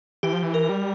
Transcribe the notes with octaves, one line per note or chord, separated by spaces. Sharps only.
E3 G4
F3
E3
A#4
G3